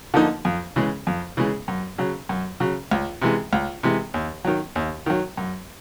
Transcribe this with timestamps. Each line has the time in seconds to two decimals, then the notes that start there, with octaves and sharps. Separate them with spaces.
0.14 D3 F3 A#3 D#4
0.45 F2
0.76 C#3 E3 G#3
1.07 F2
1.37 C#3 E3 G#3
1.68 F#2
1.98 C#3 F#3
2.29 F#2
2.60 C#3 F#3
2.91 C#2
3.22 C3 E3 G#3
3.53 C#2
3.83 C3 E3 G#3
4.14 D#2
4.45 D#3 F#3
4.76 D#2
5.06 D#3 F#3
5.37 F#2